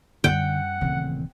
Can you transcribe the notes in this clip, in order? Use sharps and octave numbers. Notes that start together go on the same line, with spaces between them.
F#2 D3 G3 F#5 G5
D#1 D2 C#3 E3 C4